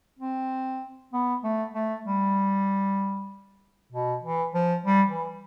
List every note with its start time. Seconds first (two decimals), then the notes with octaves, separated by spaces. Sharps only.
0.19 C4
1.13 B3
1.43 A3
1.74 A3
2.06 G3
3.92 B2
4.23 E3
4.54 F3
4.86 G3
5.09 E3